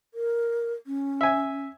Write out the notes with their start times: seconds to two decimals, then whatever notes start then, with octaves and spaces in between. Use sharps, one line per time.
0.14 A#4
0.87 C#4
1.21 E5 G#5